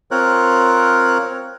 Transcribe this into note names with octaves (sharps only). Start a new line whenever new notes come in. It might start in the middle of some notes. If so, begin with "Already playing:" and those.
C4 F4 A#4 C#5 F#6